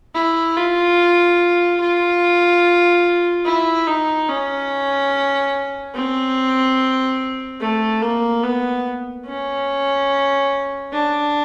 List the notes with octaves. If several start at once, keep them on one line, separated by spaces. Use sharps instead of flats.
E4
F4
F4
E4
D#4
C#4
C4
A3
A#3
B3
C#4
D4